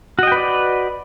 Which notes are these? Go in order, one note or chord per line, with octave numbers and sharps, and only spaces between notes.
F#4 B4 D5 D#5 G5